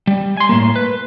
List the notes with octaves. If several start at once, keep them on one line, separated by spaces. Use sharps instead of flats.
G3
G#5 C6
A2 A#3
B4